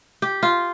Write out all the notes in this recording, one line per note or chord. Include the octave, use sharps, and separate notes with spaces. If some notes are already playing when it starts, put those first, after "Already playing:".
G4
F4